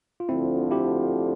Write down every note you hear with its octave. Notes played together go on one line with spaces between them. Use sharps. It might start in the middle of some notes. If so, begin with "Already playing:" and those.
F4
D2 D3 F3 C4 E4
E4 G4